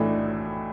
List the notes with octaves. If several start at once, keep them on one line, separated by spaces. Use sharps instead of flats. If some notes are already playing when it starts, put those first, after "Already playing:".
Already playing: B1 A2 E3 A3 D4